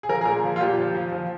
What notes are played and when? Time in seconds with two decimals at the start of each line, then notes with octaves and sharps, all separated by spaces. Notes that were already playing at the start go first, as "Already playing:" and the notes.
0.03 G#4
0.09 F3 A#4
0.21 G#4
0.26 A#2 A#4
0.44 F3
0.56 F4
0.60 A#2 G4
0.78 F3
0.95 F3
1.12 F3